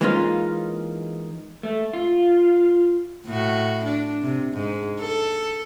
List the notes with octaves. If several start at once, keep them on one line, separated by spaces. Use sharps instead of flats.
E3 G#3 A#3 C#4 D#4 F4
A3
F4
A2 F#4
D4
C3
G#2
A4